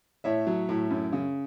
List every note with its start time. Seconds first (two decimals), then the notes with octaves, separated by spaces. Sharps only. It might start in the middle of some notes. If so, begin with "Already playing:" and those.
0.24 A2 C#5 E5
0.47 F#3
0.69 A2
0.90 F#2
1.13 C#3